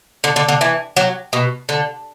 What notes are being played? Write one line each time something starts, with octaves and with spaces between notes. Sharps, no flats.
D3
D3
D3
E3
F#3
B2
D3